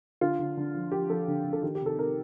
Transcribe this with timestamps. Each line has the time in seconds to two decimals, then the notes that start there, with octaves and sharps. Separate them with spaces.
0.21 D3 F4
0.39 D3
0.57 D3
0.75 F3
0.91 F3 G4
1.10 F3 A4
1.28 D3
1.45 D3
1.53 A4
1.62 D#3 G4
1.75 G4
1.81 C3 A4
1.98 C3 A#4